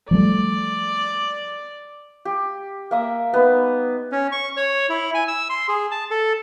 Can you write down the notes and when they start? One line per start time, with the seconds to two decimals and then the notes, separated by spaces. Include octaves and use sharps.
0.11 F3 G3 A3 D5
2.25 G4
2.91 A#3 E5 D#6
3.33 G3 B3 D#4
4.12 C#4
4.32 C#6
4.57 C#5
4.89 E4
5.14 G#5
5.28 E6
5.50 C6
5.68 G#4
5.91 A5
6.11 A4